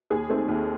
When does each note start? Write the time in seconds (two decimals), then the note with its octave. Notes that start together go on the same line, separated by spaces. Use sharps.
0.10 D#2 G#4
0.29 D#3 A3 C4
0.48 D#2